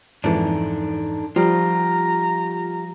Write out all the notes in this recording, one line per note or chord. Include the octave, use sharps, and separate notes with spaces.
F2 G#2 E3 D4 D#4 A4
F3 G3 F4 G4 A#5